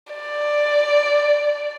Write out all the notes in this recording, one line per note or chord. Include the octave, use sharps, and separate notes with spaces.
D5